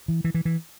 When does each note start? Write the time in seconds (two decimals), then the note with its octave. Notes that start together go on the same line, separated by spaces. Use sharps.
0.08 E3
0.24 E3
0.34 E3
0.45 E3